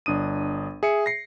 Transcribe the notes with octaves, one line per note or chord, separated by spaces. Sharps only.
G1 D4 D#6 D#7
G#4 E5 C#7
A#6 C7 C#7